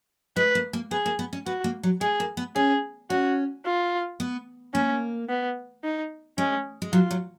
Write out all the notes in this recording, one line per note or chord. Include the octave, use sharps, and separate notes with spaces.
G#3 B4
A#3
A#3
B3 G#4
A#3
B3
C#4
B3 F#4
A#3
F#3
G#3 G#4
A#3
B3
C#4 G#4
C#4 F#4
F4
B3
A#3 C#4
B3
D#4
G#3 C#4
G#3
F#3 F4
F#3